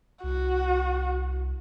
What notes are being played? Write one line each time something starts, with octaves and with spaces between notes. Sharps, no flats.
C2 F#4